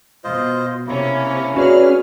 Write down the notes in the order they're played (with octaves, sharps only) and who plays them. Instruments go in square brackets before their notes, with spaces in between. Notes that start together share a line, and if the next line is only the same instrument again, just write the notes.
[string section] B2 [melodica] F4 C5 D#5
[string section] C3 C#4 [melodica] A#3 E4
[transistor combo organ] C#4 [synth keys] F#4 D5 [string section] G#4 B4 F6